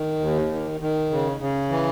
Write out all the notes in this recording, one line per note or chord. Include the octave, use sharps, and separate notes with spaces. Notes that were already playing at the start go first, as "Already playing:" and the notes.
Already playing: D#3
D#2
D#3
D#3
C#3
C#3
E3